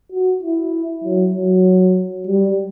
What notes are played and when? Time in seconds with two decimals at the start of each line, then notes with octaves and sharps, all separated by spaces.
0.12 F#4
0.43 E4
1.04 F#3
1.34 F#3
2.27 G3